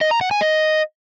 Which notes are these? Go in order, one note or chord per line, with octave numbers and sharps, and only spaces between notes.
D#5
A#5
F#5
G#5
D#5